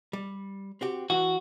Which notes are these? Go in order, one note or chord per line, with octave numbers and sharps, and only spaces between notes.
G3
C4 F#4 G4
E3 F#4